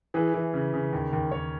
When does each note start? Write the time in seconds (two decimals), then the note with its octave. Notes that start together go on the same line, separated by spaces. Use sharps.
0.14 E3 G#4 B4
0.34 E3
0.54 C#3
0.74 C#3
0.93 D#2
1.12 D#2
1.31 D#2 C#5